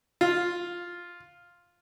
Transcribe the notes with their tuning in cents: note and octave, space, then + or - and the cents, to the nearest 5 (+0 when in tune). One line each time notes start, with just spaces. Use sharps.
F4 +0